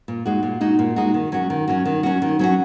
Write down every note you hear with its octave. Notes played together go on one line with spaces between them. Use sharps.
A#2
G#3 D#4 F#4
A#2
G#3 D#4 F#4
A#2
G#3 D#4 F#4
D#3
F#3 C#4 F#4
D#3
F#3 C#4 F#4
D#3
F#3 C#4 F#4
D#3
F#3 C#4 F#4